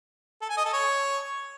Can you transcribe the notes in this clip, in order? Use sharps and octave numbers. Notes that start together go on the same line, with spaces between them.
A4
G#5
D#5
A4
C#5